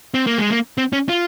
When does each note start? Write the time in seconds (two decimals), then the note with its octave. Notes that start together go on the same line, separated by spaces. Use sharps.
0.14 C4
0.27 A#3
0.38 G#3
0.50 A#3
0.78 C4
0.93 C#4
1.09 F4